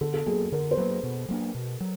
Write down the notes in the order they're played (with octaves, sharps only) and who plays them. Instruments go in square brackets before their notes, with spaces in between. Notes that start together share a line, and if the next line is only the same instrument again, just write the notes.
[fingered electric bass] D3 [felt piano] A4
[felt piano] A4
[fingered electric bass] F#3 A#3 [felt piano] G#4
[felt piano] A4
[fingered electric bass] D3 [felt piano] A#4
[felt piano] C5
[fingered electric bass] F#3 A#3 [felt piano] B4
[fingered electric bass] B2
F#3 A#3 D4
B2
F#3